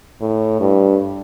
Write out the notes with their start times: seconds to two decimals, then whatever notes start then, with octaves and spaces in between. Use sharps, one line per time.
0.21 A2
0.60 G2